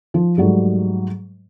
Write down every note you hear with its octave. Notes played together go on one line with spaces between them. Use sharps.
F3
G#2 F#3 G3 A3